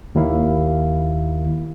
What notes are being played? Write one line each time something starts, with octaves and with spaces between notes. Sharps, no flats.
D#2 A#3 E4 F5